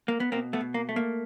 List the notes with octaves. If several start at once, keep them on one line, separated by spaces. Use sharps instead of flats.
A#3
B3
B2 A#3 C4
A3 B3
B2
A#3
A3
A#3